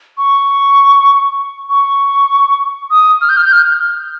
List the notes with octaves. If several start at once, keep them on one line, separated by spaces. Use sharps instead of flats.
C#6
C#6
D#6
F6
G6
F6
G6
F6